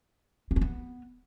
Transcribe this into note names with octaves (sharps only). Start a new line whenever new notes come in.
D4
C#4
B3